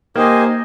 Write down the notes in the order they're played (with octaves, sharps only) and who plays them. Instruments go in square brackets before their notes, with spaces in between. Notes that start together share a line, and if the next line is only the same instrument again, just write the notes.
[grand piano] A#3 [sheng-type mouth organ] D#4 G4 C5 D#5 G#5